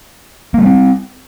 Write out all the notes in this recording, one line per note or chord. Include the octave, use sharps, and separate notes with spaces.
G3 A3 A#3 C4